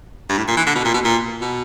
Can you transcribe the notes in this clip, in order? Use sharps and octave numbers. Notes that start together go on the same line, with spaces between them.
G2
A2
A#2
E3
D3
B2
A#2
B2
A#2
B2